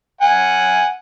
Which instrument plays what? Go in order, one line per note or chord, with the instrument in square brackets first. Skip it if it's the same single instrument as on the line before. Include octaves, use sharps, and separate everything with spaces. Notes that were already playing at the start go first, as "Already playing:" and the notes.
[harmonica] F#5 G#5